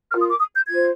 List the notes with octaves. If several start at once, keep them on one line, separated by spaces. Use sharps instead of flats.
F4 A#4 F6
D#6
D6
D#6
G6
F4 C5 G#6